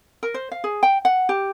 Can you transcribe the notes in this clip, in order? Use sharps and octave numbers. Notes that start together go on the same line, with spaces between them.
A#4
C5
F5
G#4
G5
F#5
G4